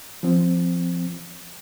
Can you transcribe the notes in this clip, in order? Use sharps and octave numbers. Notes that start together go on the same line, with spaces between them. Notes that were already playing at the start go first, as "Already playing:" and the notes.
F3 C4